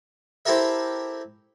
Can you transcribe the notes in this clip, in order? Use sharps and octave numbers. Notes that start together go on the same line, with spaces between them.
C4 E4 G4 A4 A#4 E5